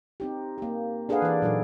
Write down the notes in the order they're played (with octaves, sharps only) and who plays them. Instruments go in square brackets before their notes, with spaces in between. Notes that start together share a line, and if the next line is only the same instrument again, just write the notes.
[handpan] C4 D#4 G4
A#3 G4
D4 G#4 A4 B4 F5 F#5
E3 D5
A#2 F#3 D#4 A4